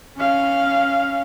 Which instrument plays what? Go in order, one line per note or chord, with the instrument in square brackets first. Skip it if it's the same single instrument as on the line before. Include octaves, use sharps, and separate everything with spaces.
[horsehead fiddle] C#4 F5